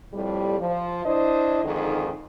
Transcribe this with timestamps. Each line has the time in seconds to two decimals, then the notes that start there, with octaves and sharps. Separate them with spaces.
0.14 F2 A2 G3
0.59 F3
1.05 D4 E4 C5 D#5
1.64 F2 G#2 D3 D#3